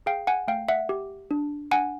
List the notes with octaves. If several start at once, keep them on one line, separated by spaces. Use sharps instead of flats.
G#4 F5 G5
F#5 G#5
A3 F5 G5
E5 F#5
G4
D4
D4 F#5 G#5